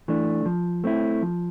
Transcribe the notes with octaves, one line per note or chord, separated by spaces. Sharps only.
E3 A3 D4
F3
A3 C4 E4
F3